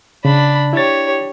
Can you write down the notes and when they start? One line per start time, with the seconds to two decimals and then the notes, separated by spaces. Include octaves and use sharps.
0.25 C#3 D4 B5
0.73 E4 G4 C#5 A6